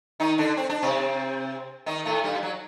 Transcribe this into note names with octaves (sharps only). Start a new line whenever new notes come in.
D#3 D#4
D3 D4
C4
D4
C3 C4
D#3 D#4
A2 A3
G2 G3
F#3